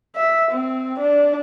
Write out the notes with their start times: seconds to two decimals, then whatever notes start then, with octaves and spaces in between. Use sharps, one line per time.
0.16 E5
0.51 C4
1.00 D4